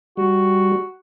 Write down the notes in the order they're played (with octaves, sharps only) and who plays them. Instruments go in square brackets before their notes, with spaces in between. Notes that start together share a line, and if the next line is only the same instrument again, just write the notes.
[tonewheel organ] G3 [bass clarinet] F#4